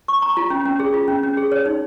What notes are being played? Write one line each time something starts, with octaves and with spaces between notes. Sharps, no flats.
C#6
A#5
F4
C#4
C#4
G#4
F4
C#4
C#4
G#4
C#5
D#4